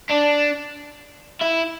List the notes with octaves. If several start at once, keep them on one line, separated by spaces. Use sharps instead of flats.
D4
E4